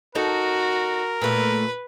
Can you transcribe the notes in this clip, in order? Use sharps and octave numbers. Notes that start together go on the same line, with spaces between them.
D#4 F#4 A4 A#4
A#2 A3 B4